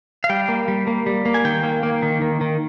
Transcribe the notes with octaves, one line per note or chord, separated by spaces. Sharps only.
F5
G3 G5
A#3
G3
A#3
G3
A#3
G#5
D#3 G5
A#3
A#3
D#3
D#3
D#3